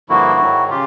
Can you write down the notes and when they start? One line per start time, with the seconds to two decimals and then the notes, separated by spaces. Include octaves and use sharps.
0.09 G2 D3 F3 A#3 E4 F#4
0.39 G#2 D#3 F#3
0.70 C#3 F4 G4